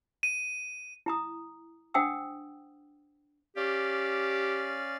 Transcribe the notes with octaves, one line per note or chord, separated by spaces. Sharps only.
D#7
E4 A#5 D#6
D4 C5 F#5 G5 D#6 E6
C#4 G4 D5 F5